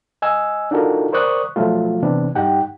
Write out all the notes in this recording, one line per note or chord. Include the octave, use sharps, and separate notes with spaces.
D#5 G#5 E6
D4 D#4 F4 F#4 A4 A#4
A#4 C5 D5 C#6 D#6 F#6
B2 F3 F#3 A3 F4
C3 E3 B3 C4 D4
G2 D#4 G4 F#5 G5